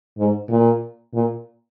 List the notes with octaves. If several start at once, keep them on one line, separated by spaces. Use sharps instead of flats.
G#2
A#2
A#2